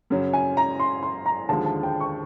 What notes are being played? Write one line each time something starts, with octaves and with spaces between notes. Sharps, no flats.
F#2 C#3 F#3
G#5
A#5
C6
C6
A#5
D#2 D3 F3 G#3 A5
A5
G5
C#6